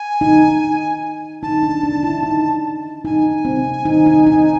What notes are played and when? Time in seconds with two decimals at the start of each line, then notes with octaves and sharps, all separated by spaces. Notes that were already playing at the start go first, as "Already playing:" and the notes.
Already playing: G#5
0.21 D#4
1.42 D#4 A5
1.63 D4
1.83 D4
2.03 E4
2.23 D#4
3.05 D#4 G#5
3.45 C4
3.85 D#4
4.06 D#4
4.26 D#4